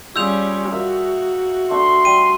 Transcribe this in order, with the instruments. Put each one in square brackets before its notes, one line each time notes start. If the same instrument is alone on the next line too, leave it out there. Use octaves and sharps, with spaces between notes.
[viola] G3 C#4 [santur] F4 G#4 [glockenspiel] E6 G6 F7
[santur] A#3 E5 [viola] F#4
[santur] A3 D4 C#6 [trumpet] C6
[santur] G3 [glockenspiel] D#7